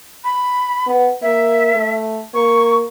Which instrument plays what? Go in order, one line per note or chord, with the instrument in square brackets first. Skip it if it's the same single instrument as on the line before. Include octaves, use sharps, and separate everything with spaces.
[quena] B5
[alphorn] B3
[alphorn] A#3 [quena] E5
[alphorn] A3
[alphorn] A#3 [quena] C#6